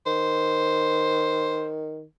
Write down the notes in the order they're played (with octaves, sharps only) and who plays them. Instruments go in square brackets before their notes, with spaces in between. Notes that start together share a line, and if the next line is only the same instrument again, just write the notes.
[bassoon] D#3 [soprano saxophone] C5